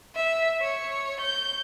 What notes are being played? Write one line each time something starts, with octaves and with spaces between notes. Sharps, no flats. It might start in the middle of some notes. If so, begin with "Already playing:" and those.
E5
C#5
G6